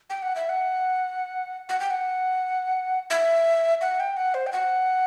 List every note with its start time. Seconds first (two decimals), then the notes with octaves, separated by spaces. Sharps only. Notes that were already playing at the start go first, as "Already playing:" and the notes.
0.10 G5
0.22 F#5
0.36 E5
0.49 F#5
1.69 F#5
1.80 G5
1.90 F#5
3.10 E5
3.81 F#5
4.00 G5
4.17 F#5
4.34 C5
4.47 G5
4.53 F#5